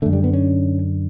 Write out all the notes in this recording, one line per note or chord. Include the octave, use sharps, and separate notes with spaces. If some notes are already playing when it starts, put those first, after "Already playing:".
F#2 D3 A3
G3
B3
C#4